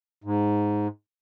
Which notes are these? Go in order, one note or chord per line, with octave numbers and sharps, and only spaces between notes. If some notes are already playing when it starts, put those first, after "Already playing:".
G#2